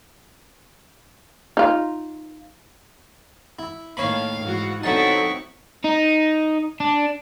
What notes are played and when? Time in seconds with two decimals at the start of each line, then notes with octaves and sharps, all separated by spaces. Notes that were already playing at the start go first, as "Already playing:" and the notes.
1.57 D#4 F4
3.59 E4
3.97 A2 D#3 A#3 C#5 F5 B5
4.42 G#2 E3 F#4
4.83 D3 F#3 B3 C4 D#4 E4 A5 C#6
5.84 D#4
6.80 D4